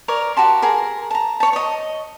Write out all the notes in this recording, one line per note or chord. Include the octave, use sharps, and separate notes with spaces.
A#4 C#5 D5
F#4 G4 A5 C6
G#4 A#4
A5 A#5
C#5 A5
C#5 D#5